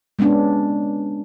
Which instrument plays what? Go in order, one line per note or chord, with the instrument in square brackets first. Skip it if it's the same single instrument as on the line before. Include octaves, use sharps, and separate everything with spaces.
[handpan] G#3 B3 C#4 D4